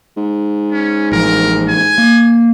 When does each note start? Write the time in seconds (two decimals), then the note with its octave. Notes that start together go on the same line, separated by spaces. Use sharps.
0.17 G#2
0.72 C#4
1.12 A1 F3 A#4
1.68 G#5
1.98 A#3